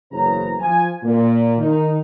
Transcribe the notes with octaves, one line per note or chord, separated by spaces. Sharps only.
F#1 E2 C#3 B4 C5 A#5
F3 G#5
A#2
D#3 D#4